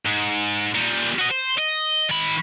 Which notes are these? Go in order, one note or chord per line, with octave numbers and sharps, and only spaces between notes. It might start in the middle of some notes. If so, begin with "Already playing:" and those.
G#2
A#2 G3
F#4 D#5
C5
D#5
D#3 B5